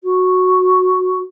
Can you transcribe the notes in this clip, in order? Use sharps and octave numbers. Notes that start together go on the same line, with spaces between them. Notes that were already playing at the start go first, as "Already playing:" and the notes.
F#4